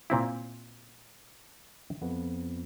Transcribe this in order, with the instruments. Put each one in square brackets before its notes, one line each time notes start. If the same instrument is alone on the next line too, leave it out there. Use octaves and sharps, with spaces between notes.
[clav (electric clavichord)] A#2 C4 E4
[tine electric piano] F2 B3